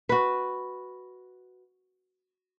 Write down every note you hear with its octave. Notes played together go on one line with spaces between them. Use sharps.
F#4 B4